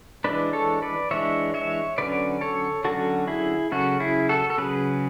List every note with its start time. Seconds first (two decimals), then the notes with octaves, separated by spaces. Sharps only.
0.24 E3 G#3 D4 B4 D5
0.53 A4 C#5
0.82 B4 D5
1.11 E3 G#3 D4 C#5 E5
1.54 C#5 E5
1.98 D3 F#3 C#4 B4 D5
2.41 A4 C#5
2.84 D3 F#3 C#4 F#4 A4
3.28 E4 G#4
3.72 C#3 F#3 C#4 F#4 A4
4.00 E4 G#4
4.29 F#4 A4
4.50 A4
4.58 C#3 F#3 C#4 G#4 B4